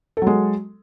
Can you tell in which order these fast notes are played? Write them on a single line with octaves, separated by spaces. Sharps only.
A4 F#3 G#3